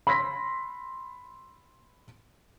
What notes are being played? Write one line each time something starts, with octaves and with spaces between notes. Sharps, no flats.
B5 C6 E6 A#6 B6